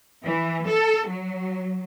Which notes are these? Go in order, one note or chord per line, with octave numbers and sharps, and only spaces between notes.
E3
A4
F#3